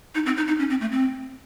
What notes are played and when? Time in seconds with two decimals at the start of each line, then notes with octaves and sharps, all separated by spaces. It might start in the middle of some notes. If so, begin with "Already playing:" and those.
0.15 D#4
0.26 C4
0.37 D#4
0.48 D#4
0.59 C#4
0.70 C4
0.81 A3
0.92 C4